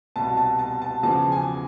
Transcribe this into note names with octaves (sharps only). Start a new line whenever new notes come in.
C2 B2 A5
A5
A5
A5
E2 C#3 F3 A5
G#5